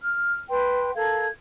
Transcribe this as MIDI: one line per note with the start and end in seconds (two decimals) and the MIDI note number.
0.01 0.38 89
0.49 0.90 71
0.49 0.90 79
0.49 0.90 84
0.94 1.25 69
0.94 1.25 70
0.94 1.25 77
0.94 1.25 92